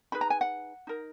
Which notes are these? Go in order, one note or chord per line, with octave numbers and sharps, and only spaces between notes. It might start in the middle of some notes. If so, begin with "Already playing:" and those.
D#4 G#4 B4 B5
A#5
G#5
F#5
D#4 A#4